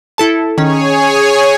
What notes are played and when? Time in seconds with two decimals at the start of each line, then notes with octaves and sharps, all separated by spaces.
0.18 E4 A4 A5
0.58 D#3 C#4 G#4 C#5 G#5